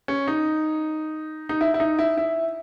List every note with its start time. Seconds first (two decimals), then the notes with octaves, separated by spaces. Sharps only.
0.08 C#4
0.28 D#4
1.49 D#4
1.61 E4
1.74 E4
1.80 D#4
1.99 E4
2.17 E4